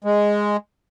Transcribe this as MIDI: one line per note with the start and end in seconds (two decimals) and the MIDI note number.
0.04 0.57 56